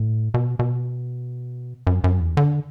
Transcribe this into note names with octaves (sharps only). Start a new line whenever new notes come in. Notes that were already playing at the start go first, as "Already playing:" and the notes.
Already playing: A2
B2
B2
F#2
F#2
E2
D3